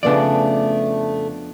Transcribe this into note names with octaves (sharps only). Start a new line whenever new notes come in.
F2 C#3 A3 B3 D4 D5